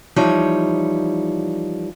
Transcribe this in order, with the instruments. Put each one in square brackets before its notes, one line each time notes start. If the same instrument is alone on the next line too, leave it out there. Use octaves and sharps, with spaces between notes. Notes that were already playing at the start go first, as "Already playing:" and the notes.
[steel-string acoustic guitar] E3 F3 G3 D#4 C#5